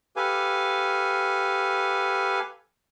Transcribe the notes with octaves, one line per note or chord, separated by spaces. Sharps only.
G4 A4 B4 F5 G#5